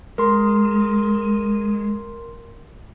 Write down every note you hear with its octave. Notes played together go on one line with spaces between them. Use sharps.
G#3 A#4 C6